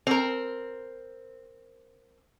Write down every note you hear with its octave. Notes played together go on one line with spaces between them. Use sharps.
C4 A#4